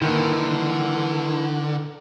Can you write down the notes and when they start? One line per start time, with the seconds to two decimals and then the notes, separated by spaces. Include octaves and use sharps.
0.02 D3 D#3 A#3 E4 A#4 B4